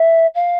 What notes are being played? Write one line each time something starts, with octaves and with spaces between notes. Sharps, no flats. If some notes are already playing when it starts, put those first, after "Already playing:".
Already playing: E5
F5